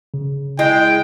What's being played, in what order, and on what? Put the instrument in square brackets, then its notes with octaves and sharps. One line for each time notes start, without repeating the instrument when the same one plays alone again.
[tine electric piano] C#3
[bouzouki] G#3 [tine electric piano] E4 G6 C7 [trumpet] G5